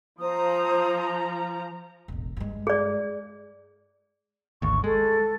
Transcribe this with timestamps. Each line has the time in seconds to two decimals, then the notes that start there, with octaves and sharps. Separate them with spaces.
0.21 F3 C5 A#5 D#6
2.08 E1 A1
2.37 G2 G#3
2.67 G#4 D5
4.62 G#1 D2 C#6
4.84 G#3 A4